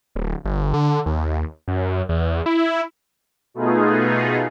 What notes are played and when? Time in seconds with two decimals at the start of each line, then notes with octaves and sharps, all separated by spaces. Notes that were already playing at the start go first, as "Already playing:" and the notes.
0.16 D1
0.45 G1
0.74 D3
1.06 D#2
1.68 F#2
2.09 E2
2.46 E4
3.54 B2 A3 B3 D#4 F4 G#4